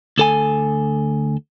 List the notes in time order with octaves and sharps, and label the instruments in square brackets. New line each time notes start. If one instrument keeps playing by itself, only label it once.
[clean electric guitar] D2 A4 G#5